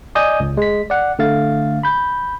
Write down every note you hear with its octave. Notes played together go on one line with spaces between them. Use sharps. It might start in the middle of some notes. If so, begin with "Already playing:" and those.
D5 D#5 G#5 D#6 G6
C#2
G#3 B6
D5 F#5
D3 A3 F5 A6
B5 G6